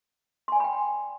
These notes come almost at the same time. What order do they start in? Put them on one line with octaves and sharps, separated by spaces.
C6 G#5 D5 B5 G5